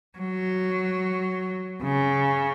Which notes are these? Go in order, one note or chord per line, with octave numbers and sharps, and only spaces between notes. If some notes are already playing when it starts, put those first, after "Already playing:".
F#3
C#3